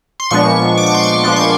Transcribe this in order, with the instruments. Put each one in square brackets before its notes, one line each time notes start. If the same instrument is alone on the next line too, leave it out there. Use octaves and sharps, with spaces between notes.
[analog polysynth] C6
A#2 F3 G#3 B3 D4 C#6
D6
C#6
C6
C#6
A#2 F3 G#3 B3 D4 D6
C6